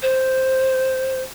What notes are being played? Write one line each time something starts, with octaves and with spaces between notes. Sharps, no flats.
C5